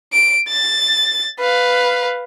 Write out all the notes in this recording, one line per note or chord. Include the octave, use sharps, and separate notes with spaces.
D7
A6
B4 F5